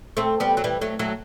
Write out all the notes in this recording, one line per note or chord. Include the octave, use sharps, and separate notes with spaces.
A3 C4
G3 B3
F#3
E3 G3
F#3 A3
F#3 A3